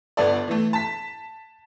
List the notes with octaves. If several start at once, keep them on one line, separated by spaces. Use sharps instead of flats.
G1 B3 A4 D5
E3 A3
A5 B6